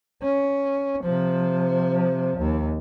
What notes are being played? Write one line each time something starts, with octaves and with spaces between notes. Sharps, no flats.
C#4
C3 F3
D#2